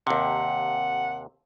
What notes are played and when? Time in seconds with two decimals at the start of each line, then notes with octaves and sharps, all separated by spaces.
0.07 D#2 C3 F#5